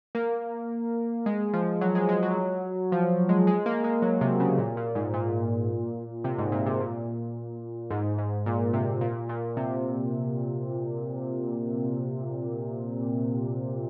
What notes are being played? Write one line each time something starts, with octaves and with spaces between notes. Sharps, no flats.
A#3
G#3
F3
F#3
G#3
G#3
F#3
F3
G#3
G#3
A#3
G#3
F#3
C3
C#3
A#2
A#2
G#2
A#2
C3
G#2
A#2
C3
A#2
G#2
G#2
A#2
C3
A#2
A#2
C3